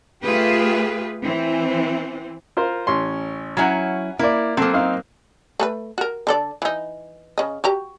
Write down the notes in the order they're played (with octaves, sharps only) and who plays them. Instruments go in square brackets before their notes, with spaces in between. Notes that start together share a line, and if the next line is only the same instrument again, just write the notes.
[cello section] A3 F4 G4 G#4 B4
E3 C4
[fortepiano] F4 A#4 C5
A1 C#4 C6
[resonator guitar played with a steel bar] F#3 C#4 E4 [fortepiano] F#5 G#5 A#5
[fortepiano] A#3 D5 [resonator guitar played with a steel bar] E4
[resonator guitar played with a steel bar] F#3 A#3 [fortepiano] C4 A4
[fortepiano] C4 D#4 F5
[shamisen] A3 A4 B4
F#4 A#4
D3 A4 D5
E3 D#4
C#3 D#5
F#4 G4 A#5